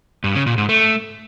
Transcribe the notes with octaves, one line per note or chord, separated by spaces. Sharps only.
G2
C#3
A#2
G#2
A3